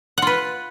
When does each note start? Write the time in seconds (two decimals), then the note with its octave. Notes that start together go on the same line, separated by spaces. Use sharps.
0.18 F#5
0.22 F4
0.27 B4